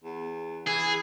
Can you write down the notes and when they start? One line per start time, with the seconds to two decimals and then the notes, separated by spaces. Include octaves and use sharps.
0.04 E2
0.67 E3 G#4